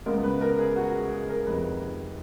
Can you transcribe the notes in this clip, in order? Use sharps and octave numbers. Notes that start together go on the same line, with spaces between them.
C#2 C#3 G#3 B3 A#4
B4
A#4
G#4
F#4
G#4
G#4
A#4
F1 F2 D#3 B4